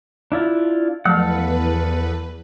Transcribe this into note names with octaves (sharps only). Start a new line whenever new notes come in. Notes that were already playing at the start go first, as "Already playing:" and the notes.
D4 E4 F4
E2 F3 F#3 A3 A4 B4 F5 F#5